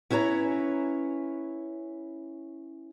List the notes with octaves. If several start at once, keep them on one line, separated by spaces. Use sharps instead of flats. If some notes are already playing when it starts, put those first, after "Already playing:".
C#4 E4 B4 C#5 A#5